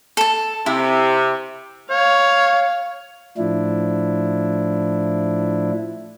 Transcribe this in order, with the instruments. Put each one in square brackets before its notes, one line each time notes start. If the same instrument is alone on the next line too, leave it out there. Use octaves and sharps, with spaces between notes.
[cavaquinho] A4 A5
[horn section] C3 [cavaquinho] E4
[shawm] C#5 [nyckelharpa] F5
[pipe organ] A2 F3 D4 E4